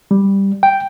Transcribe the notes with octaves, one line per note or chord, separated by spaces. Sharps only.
G3
G5